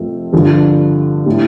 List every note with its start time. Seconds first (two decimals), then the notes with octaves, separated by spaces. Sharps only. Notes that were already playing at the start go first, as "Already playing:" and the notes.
Already playing: F2 C3 F3 A3 C4
0.33 G2 D3 F3
1.26 A2 G3 D4